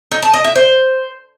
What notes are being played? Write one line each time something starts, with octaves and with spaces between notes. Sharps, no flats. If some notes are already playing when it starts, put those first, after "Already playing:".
D#4
A5
D#5
E5
C5